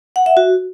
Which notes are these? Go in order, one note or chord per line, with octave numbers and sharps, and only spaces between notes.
F#5
E5
F#4